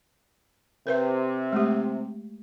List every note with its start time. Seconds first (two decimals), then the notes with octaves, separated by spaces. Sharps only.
0.87 C3 A#4 B4 E5
1.53 G#3 A3 G4